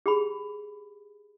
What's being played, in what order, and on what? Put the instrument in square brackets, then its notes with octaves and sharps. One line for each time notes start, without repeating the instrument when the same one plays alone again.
[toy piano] G4 G#4 B5